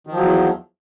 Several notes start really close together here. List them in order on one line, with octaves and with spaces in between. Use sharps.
D#3 F3 F#3 E2